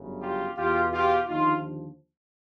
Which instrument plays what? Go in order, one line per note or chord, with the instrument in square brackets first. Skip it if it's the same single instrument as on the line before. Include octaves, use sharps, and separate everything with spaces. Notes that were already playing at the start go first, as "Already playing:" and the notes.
Already playing: [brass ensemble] G1 F#2 C#3
F4 G4
E2 B2 F4 G4
F4 G4
D#2 D3 F3 D#4 F4